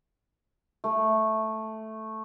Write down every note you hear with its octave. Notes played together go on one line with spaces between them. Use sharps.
A3